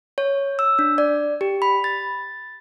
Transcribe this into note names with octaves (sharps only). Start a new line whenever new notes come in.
C#5
E6
D4
D5
G4
B5
A6